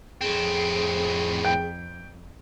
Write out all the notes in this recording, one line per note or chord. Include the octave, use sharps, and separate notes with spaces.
F2 A2 C4 G#4
G5